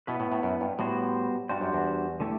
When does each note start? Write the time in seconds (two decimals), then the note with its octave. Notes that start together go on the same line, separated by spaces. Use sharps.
0.07 B2 B3 E4 B4
0.20 A2
0.32 A2
0.43 F#2
0.61 G2
0.79 A2 G3 B3 F#4 C5
1.49 G2 G3 D4 F#4 C5
1.61 F#2
1.73 E2
2.20 D3 A3 E4 G4